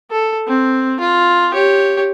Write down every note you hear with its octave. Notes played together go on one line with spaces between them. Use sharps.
A4
C4
F4
G4 C#5